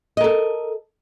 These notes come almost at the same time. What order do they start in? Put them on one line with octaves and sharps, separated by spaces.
D#5 A#4 A4